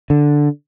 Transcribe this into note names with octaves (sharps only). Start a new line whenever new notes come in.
D3